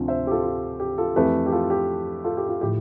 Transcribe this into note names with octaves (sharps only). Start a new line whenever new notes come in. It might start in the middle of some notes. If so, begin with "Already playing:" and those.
Already playing: D2 C3 F3
C5 E5
G4
F4 A4
F4
G4
F4 A4
F2 E3 A3 G4 B4
G4
F4 A4
G4
F4 A4
G4
F4
A2 F3 G4